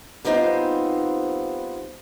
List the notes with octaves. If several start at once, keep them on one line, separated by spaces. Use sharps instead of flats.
G3 B3 C4 D#4 F4 C5